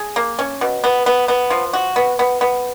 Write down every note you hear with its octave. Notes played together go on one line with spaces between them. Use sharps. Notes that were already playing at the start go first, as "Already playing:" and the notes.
Already playing: G#4
A#3
C#4
B2
B3
B3
B3
F3
F#4
B3
B3
B3